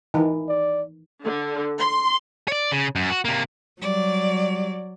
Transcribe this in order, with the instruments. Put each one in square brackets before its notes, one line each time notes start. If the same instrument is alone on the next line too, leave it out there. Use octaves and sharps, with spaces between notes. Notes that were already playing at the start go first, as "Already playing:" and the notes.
[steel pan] D#3 E3
[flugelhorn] D5
[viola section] D3
C6
[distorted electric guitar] C#5 D5
C#3
F#2
F#4
C3 A#3
[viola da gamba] F#3 [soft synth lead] G3 [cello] D5